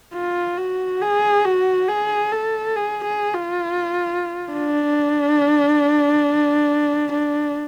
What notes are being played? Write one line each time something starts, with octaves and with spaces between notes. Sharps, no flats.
F4
F#4
G#4
F#4
G#4
A4
G#4
G#4
F4
D4
D4